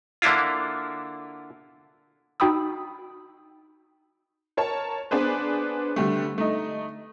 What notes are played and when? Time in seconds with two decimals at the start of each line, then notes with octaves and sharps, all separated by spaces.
0.22 D3 A#3 D4 E4 F4
2.40 D#4 F#4 G5 B5 D#6 E6
4.57 A#4 C#5 A5
5.11 B3 D4 G#4 B4 C5
5.96 D3 G3 A3
6.38 A3 D#4